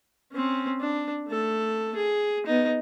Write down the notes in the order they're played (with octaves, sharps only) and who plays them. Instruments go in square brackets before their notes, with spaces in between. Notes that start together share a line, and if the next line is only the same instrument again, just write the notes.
[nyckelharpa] C4 C#4
D4
A3 A4
G#4
B3 D#4